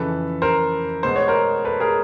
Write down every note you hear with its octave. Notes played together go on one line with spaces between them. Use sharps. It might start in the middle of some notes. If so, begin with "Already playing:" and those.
Already playing: F2 C#3 E3 A4 B4
A#4 C5
B2 G#3 B3 C5
C#5
A#4 C5
A4 B4
G#4 A#4